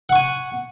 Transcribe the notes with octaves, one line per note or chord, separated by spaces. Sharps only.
F#5 G#5 C#6